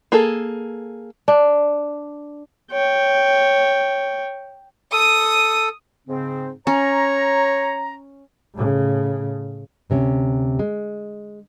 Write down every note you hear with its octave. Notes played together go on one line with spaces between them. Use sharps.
A#3 G#4 A4
D4
C#5 G5
A4 D#6 D#7
G#2 C#3 C4
C#4 C#5 A#5
A2 C#3
D2 C3 C#4
G#3